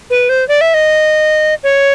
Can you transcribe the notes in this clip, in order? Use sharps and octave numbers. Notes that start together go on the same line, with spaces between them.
B4
C5
D5
E5
D#5
C#5